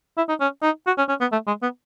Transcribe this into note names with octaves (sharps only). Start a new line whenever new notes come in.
E4
D#4
C#4
D#4
F#4
C#4
C#4
B3
A3
G#3
B3